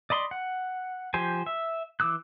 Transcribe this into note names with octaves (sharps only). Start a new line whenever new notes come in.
D5 D#5 B5 C6
F#5
F3 G4 C5 G#5
E5
E3 D6 E6 F#6